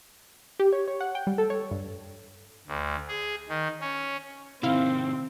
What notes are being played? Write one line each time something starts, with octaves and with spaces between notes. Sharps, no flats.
G4
C#5
C#5
F#5
G5
G3
A4
C#5
G2
D2
G#4
D#3
C#4
C3 D#3 C4 E4 F5